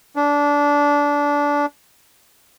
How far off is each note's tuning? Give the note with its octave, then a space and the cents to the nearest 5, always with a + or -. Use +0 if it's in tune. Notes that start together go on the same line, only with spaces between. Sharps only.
D4 -20